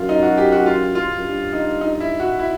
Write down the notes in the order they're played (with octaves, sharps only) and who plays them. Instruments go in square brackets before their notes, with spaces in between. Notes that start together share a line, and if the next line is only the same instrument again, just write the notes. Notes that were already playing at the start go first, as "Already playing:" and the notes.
Already playing: [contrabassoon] F#2 [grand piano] F4
[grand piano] D#4
F#4
G4
F#4
F4
F4
[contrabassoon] F#2
G2
[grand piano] D#4
D#4
E4
F#4
E4